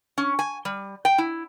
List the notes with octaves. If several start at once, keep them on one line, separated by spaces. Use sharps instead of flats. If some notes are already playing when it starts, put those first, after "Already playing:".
C#4
G#5
G3
G5
E4